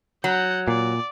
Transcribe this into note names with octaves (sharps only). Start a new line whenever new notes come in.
F#3 F#5 G6
A#2 D5